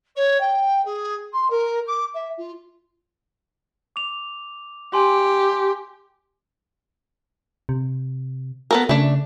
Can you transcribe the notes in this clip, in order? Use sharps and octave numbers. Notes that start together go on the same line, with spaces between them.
C#5
G5
G#4
C6
A#4
D6
E5
F4
D6 F7
G4 G#5 C6
C3
B3 A4 A#4
C#3 A3 D4